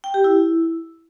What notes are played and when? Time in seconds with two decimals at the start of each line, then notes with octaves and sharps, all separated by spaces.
0.04 G5
0.14 G4
0.24 E4